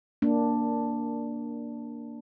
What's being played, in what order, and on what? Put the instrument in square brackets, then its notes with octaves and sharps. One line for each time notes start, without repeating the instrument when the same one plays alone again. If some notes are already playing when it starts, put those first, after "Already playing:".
[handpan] A#3 D4